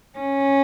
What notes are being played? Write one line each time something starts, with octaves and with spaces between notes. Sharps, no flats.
C#4